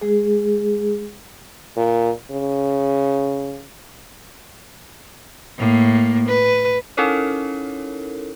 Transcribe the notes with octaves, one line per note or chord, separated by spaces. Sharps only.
G#3 G#4
A#2
C#3
A2 A#3
B4
C#4 D#4 E4 A4 A#4 C#5